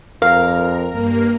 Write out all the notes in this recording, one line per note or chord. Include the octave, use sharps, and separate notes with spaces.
F2 A#4 F5
G2 A#3